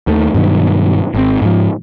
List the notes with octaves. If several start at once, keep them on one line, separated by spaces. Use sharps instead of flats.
D#2 D#3 A3
G2 B2 D#3 F#3
G#1 C4
G#2 F3